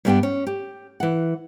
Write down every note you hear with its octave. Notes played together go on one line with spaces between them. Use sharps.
G2 G3 G#3 B3 D4 G5
C#4
G4
E3 F#5